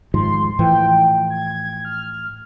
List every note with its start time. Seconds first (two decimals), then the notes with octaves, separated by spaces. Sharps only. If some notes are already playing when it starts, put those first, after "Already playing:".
0.14 G#2 D#3 F3 C6
0.59 A2 E3 F3 G5
1.30 G#6
1.85 F6